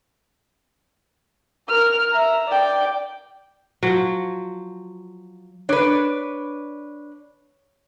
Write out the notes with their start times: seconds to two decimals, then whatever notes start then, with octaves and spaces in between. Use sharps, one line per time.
1.69 A#4 F6
2.11 E5 A#5
2.48 D5 G5
3.83 F3 F#3
5.69 D4 B4 C#5